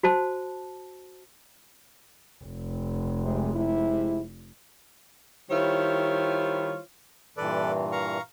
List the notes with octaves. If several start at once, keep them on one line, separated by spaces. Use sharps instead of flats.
F#4 C5 A5
F1
C3 G#3
C3 G#3 E4
D#3 G3 E4 F4 C5 C#5
G2 A#2 E3 A4 B4 D5
F5 A#5 C#6